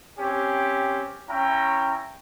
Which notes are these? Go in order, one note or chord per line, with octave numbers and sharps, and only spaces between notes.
C4 C#4 G4
C#4 E4 G5 A#5